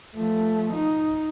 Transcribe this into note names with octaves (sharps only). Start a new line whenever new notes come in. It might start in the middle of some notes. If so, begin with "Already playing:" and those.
F3 A3
D#4